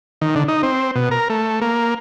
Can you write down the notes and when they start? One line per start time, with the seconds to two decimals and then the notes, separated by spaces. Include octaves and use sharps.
0.21 D#3
0.36 D3
0.48 D#4
0.63 C4
0.95 B2
1.11 A#4
1.30 A3
1.61 A#3